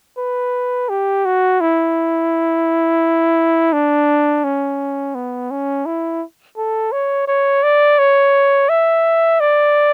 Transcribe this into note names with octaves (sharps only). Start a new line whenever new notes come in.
B4
G4
F#4
E4
D4
C#4
B3
C#4
E4
A4
C#5
C#5
D5
C#5
E5
D5